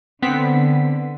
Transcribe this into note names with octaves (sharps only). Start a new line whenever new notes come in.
D3 B3 C4 B6